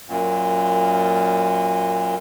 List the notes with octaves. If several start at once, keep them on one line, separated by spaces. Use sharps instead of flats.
F#2 A#2